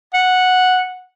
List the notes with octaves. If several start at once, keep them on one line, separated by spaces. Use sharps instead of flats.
F#5